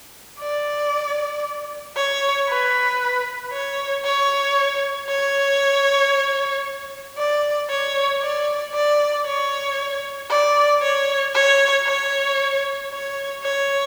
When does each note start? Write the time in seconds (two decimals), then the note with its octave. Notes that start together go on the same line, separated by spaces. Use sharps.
0.40 D5
1.96 C#5
2.48 B4
3.53 C#5
4.05 C#5
5.09 C#5
7.18 D5
7.69 C#5
8.22 D5
8.74 D5
9.26 C#5
10.30 D5
10.82 C#5
11.35 C#5
11.86 C#5
12.91 C#5
13.43 C#5